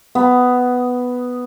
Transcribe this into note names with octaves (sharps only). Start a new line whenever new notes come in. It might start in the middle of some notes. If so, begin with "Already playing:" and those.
B3